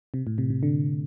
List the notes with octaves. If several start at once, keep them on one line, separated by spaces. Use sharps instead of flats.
C3
A2
C3
C3
D3